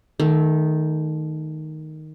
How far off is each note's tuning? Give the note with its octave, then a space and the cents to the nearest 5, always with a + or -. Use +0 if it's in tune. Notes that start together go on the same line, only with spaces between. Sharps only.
D#3 +0 A3 -20